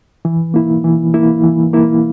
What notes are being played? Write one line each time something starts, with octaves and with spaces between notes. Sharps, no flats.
E3
A#3 E4
E3
A#3 E4
E3
A#3 E4